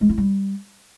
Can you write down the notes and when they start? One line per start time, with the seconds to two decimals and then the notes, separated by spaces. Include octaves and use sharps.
0.01 G#3
0.09 E4
0.18 G3